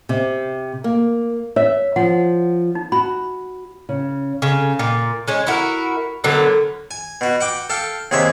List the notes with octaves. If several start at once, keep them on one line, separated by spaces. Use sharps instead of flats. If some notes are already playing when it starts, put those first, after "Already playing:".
C3
A#3
C#5 E5
F3 F#5
D#4
F#4 B5
C#3
C#3
A#2
G#3 C#4
E4 F#4 A4 A#4
D3 F#3 B3 A#4
G#5
B2 F#4
F#5 G5 D6
A4 F5 G5
D#2 C3 G#4 C#5 E5